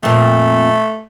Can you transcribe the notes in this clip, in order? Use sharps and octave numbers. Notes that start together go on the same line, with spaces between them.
F2 A#2 A3